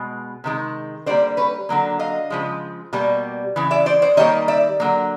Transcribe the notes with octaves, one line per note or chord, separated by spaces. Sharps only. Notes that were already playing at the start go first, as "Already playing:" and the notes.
Already playing: B2 G#3
C3 D#3 G#3
D3 G3 A#3 C5 D5
B4 C#5
D3 F#3 A#3
D#5 F5
C#3 F3 G#3
B2 G3 A#3
C#3 E3
D5 E5
C5 D5
C5 D5
D#3 G3 A#3 C#5 D#5
D5 E5
D3 F#3 A#3